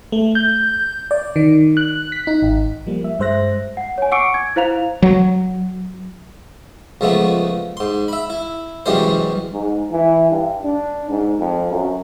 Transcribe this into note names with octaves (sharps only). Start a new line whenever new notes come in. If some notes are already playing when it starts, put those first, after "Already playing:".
A3
G6
D5
D#3
F#6
B6
D#4
G#1
F3 G3 A#3
E5
G2 G#3 C5 E5 F#6 A#6
F#5
C#5 G#5
F#5 C#6 D6 E6 C#7 D7
G#6
E4 C5 F5 A#5 F7
F#3
C#2 F3 G#3 A3 B3
G#2 C6
E5 B5
E4
C2 F#2 E3 G3 G#3 C5
G#2
E3
G2
D4
G#2
F2
F#2